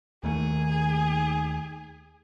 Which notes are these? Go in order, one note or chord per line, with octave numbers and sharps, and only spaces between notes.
D#2 D#3 A3 G#4